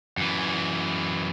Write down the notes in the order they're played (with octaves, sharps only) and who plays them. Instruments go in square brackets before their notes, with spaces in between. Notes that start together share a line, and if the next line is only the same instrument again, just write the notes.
[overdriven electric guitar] F#2 E3